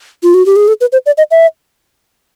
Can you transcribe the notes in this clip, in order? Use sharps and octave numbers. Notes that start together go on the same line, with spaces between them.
F4
F#4
G4
G#4
A4
B4
C5
D5
D#5
E5